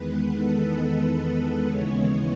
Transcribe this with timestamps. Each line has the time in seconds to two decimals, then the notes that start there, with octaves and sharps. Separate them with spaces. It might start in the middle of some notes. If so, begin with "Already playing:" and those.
Already playing: E2 D#3 G#3 B3 B4
0.34 A4
1.67 D#2 C#3 E3 G#3 B3 C#5